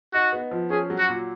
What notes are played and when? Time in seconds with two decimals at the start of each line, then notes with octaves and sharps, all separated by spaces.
0.14 D#4 F#4
0.33 B3
0.51 F3
0.70 C#4 G#4
0.90 F#3
0.99 F#4
1.08 A#2